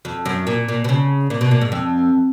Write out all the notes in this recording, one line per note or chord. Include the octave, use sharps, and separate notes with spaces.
F2
F#2
A#2
A#2
B2
C#3
A#2
B2
A#2
G#2
F2